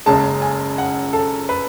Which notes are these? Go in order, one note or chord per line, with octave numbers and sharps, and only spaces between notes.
F#1 F#2 C#3 G#3 A5
G#5
F#5
A4
B4